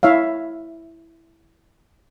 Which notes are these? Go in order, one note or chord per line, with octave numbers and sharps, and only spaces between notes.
E4 C#5 E5 F5